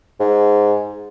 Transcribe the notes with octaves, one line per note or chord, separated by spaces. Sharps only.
G#2